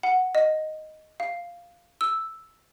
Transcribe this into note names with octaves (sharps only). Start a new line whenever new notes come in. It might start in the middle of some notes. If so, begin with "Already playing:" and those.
F#5
D#5
F5
E6